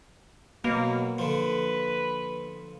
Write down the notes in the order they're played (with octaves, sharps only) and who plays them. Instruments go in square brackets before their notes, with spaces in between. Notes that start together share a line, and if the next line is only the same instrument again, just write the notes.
[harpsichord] B2 [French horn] F#3 [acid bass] A#3
[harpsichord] D3 F3 [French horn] B4